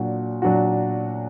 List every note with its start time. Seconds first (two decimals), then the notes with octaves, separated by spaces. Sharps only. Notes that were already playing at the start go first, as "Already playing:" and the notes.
Already playing: A#2 F#3 D4 F#4
0.42 A#2 F#3 D4 F#4